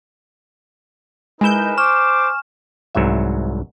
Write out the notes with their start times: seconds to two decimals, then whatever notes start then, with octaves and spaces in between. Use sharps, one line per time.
1.41 G#3 D#4 E4 A#4 B4 G#5 G6 E7
1.78 C5 C#6 D6 F6 E7
2.95 C2 G#2 F#3 E5